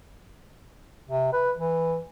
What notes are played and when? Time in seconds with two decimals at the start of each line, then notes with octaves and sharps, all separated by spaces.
1.09 C3
1.33 B4
1.57 E3